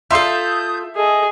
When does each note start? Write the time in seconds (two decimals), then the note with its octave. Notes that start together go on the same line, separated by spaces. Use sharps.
0.11 F4 A4 E5 C6 D#6 G6 C7
0.96 G#4 A4 D#5